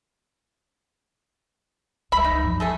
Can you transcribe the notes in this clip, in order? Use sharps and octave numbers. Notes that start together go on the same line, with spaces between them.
C#2 G3 E5 B5
D#4
G2 F3
A3 G#4 A4